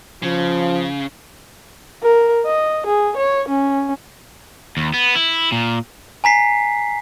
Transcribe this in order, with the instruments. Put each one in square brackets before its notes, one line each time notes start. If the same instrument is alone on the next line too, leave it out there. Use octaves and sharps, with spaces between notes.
[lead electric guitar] C#3 [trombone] F3
[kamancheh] A#4
D#5
G#4
C#5
C#4
[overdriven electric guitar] D#2
B3
E4
A#2
[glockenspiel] G#5 A#5 B6 C7